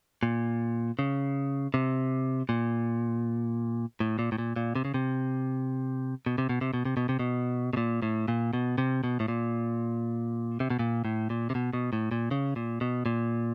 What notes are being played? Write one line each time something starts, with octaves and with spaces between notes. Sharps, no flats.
A#2
C#3
C3
A#2
A2
A#2
A2
A#2
A#2
C3
C#3
C3
B2
C3
B2
C3
B2
C3
B2
C3
B2
B2
A#2
A2
A#2
B2
C3
B2
A2
A#2
C3
B2
A#2
A2
A#2
C3
B2
B2
A2
A#2
C#3
A#2
B2
A#2